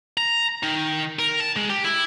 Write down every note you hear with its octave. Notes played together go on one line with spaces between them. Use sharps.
A#5
D#3
A#4
A5
G#3
G4
E4